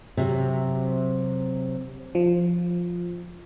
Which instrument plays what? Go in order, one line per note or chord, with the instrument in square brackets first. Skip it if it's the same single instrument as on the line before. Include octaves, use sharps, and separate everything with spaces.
[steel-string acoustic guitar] C3 F#3
[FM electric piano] F3